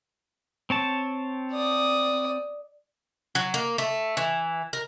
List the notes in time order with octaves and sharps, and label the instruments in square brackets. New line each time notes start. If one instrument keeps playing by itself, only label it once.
[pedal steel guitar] C4 C#5 A5
[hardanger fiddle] D5 D#6
[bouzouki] F#3
A#3
A3
E3
A#4